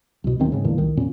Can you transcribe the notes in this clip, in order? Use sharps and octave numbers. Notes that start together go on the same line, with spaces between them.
C2 B2
D1 D#2 D#3 C4
G#2 C#3
E1 E2 A#2 D3
C2 D#3
E2 A#2 C#4